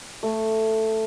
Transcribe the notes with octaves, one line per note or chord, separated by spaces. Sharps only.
A3